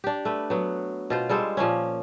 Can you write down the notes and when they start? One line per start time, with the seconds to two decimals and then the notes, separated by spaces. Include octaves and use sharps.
0.04 D4 G4
0.25 A3 B4
0.50 F#3 B3
1.10 B2 F4 C5
1.29 G3 G#3 A4 C5
1.57 A#2 F3 A#3 C#4